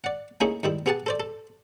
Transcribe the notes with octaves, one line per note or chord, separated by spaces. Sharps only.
D5 F#5
A3 A#3 C#4 D#4 E4 G#4
G#2 D#3 G3 E4
B3 G4 G#4 F#5 G#5 A5
A4 C5 D5
A4